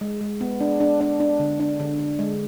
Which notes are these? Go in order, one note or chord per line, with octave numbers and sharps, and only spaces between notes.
G#3
G#3
B3
D4
D4
D4
D4
D3
D4
D3
D3
G#3